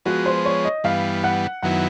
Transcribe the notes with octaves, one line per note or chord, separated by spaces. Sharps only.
F3 G#3 B3 F#4
C5
C#5
D#5
G2 E3 G3 B3 F5
F#5
F#2 D#3 F#3 B3 E4 F#5